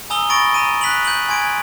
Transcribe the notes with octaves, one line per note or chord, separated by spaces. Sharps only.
G#5 A#5 D#6 E6 G7
B5 C#6 A6 A#6 D7 G7
A#5 D#7
F#6 B6 F7 F#7
G6 D#7 F#7
G#5 C6 G#6 D7